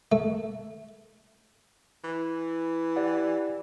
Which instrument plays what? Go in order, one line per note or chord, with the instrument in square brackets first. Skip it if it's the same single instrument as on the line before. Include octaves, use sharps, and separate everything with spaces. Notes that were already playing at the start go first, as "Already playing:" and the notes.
[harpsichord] A3
[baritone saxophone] E3
[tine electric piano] G4 D5 F#5